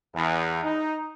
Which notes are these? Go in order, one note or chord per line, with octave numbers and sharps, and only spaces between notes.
E2
D#4